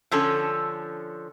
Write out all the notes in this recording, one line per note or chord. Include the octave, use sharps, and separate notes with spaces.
D3 F3 C#4 A4